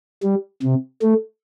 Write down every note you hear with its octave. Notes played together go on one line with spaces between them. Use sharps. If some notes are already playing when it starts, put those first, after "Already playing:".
G3
C3
A3